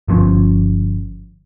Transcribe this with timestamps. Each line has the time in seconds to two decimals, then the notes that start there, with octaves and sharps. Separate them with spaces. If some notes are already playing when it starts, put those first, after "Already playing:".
0.08 G1 F3 C#4